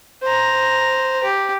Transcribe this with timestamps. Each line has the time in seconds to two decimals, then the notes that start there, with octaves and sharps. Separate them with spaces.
0.23 C5 A#5
1.24 G4